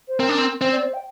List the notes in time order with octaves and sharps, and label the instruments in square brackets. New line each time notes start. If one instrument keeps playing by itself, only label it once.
[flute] C5
[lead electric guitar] C4 [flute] A#4
[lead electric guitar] D4
C4
[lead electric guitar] C4 [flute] C5
[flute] D5
C5
G5